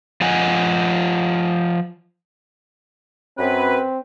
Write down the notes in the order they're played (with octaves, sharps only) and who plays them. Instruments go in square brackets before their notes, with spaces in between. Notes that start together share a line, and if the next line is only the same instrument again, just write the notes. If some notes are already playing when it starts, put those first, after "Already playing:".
[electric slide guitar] F3 F4 D#5 F#5 G#5
[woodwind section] F#2 B4 [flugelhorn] C4